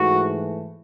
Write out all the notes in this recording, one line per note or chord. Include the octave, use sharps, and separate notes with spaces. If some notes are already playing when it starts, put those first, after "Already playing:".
Already playing: G#2 E3 A3 F#4